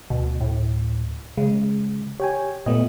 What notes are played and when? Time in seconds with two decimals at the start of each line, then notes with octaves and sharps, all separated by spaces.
0.10 D2 B2
0.41 A2
1.37 C#3 G#3
2.20 G4 C#5 G5 G#5
2.66 A#2 A3 B3 D#5